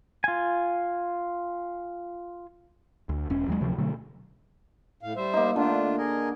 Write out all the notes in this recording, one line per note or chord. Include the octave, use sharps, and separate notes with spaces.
F4 G#5
D2
E1 C#4
D#2 F#3 G#3
D2 C3 F3 F#3
B2 D3 F#3 A3
A2 F5
G3 C5 E5
A#3 D#4
D3 A3 D4 F4
G#4 A#4 D#5